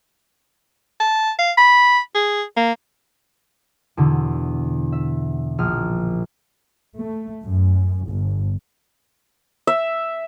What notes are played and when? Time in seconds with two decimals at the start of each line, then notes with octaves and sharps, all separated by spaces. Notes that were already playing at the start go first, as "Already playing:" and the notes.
1.00 A5
1.39 F5
1.58 B5
2.15 G#4
2.57 A#3
3.97 E2 B2 D3
4.92 E5
5.58 A#1 D#6 F6
6.97 A3
7.42 F#2
8.08 G1
9.67 E5